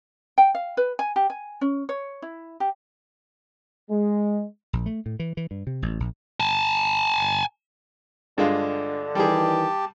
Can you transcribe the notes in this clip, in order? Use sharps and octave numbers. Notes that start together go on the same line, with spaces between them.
G5
F5
B4
G#5
G4
G#5
C#4
C#5
E4
G4
G#3
A#1
A3
A2
E3
E3
G2
C3
A1
A#1
G#5 A5
G2 D3 G#3 F4
D#3 E3 G3 G4 G#4 A5